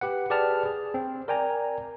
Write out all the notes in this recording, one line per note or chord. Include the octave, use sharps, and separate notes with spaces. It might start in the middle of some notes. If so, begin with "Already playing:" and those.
G4 B4 F#5
G4 G#4 B4 D5 A5 F6
G#4
C4
A#4 D5 G5 G#5 A#5